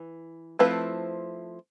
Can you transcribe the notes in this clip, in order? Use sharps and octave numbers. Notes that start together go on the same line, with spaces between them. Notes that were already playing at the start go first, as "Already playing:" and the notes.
Already playing: E3
F3 A3 C4 E4 B4